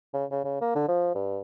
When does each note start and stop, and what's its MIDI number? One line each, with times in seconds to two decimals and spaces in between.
0.14 0.24 49
0.31 0.41 49
0.44 0.58 49
0.61 0.70 58
0.75 0.86 50
0.88 1.14 53
1.15 1.41 43